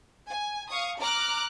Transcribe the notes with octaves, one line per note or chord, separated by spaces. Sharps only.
G#5
F5 C#6 D#6
A#5 D6 F6 F#6